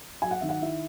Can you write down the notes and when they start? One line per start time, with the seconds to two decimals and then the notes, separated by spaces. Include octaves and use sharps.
0.22 F#3 G#5
0.31 F#5
0.41 D#3 E5
0.49 F#5
0.61 E4 E5